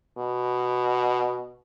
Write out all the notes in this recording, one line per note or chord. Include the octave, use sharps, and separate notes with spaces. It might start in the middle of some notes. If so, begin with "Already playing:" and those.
B2